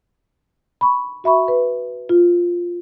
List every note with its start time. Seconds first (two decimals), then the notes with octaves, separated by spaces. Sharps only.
0.81 B5 C#6
1.24 F#4 E5 B5 C#6
1.48 B4
2.09 F4